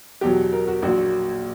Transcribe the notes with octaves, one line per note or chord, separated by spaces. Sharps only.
E2 B2 F#3 G4
A#4
F#4
A#1 A#2 F#3 F#4